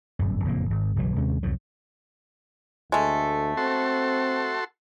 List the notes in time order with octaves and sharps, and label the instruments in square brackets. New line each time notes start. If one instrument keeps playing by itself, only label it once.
[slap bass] D1 G1 F#2
F#1 F2 A#2 A#3
G#1
F#1 B1 E3 F#3
D#2 C3 G#3 C#4
C2 F2 G#2 F#3
[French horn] D2 [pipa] G#3 A3
[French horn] C4 [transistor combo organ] F#4 A4 C6